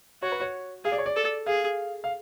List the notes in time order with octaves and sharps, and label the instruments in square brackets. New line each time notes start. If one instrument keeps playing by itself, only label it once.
[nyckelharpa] F#4 [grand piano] C#5
[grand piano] B4
C#5
[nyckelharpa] G#4 [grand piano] F5
[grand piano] D5
C#5
D5
[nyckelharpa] A4
[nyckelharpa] G#4 [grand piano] F5
[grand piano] F5